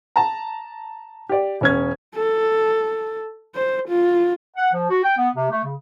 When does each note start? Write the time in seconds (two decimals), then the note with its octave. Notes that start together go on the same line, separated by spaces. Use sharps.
0.16 A5 A#5
1.29 G4 D5
1.61 E1 C#4 G#6
2.15 A4
3.55 C5
3.89 F4
4.57 F#5
4.73 F3
4.90 F#4
5.03 G5
5.17 B3
5.35 C3
5.50 A3
5.64 C#3